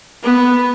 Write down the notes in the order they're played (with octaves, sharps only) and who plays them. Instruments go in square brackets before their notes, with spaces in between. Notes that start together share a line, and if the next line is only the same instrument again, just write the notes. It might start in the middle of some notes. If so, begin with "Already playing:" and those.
[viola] B3